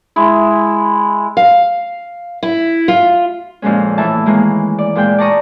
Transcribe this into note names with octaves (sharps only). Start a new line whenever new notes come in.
G#3 E4
F5
E4
F4
F2 A#2 G#3 C#4
A2 E3 E5 A5
D#3 E3 G#3 A#3
D5
A#2 G#3 G5
D5 A5 A#5 C#6 D#6